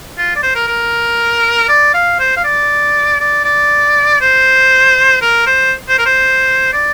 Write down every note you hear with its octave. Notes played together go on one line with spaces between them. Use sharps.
F4
D5
C5
A#4
A#4
D5
F5
C5
F5
D5
D5
D5
C5
A#4
C5
C5
A#4
C5
D5